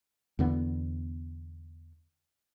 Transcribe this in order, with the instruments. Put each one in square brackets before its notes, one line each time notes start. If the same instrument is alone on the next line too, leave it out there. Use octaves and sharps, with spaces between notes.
[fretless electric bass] E2 D3 B3